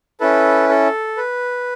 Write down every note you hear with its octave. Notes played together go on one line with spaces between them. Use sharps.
C#4 E4 A4 B4
A4
B4